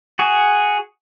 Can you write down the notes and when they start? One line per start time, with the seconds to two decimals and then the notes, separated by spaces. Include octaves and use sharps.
0.19 F#4 G#4